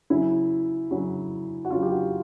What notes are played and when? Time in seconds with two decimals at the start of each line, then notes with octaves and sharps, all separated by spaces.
0.10 C#3 F#3 E4
0.91 C#3 F#3
1.65 F#4
1.71 C#3 F#3 F4
1.82 G4
1.91 F#4